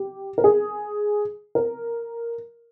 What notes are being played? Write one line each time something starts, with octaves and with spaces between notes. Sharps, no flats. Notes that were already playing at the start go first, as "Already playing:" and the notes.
Already playing: G4
A#4
G#4
A#4